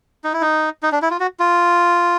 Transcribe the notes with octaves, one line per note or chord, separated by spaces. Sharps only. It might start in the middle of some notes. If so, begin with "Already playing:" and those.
D#4
E4
D#4
D#4
D4
E4
F4
F#4
F4